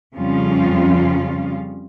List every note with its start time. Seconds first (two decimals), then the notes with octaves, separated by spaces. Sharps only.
0.15 F2 C#3 F3 G3 C#4 F4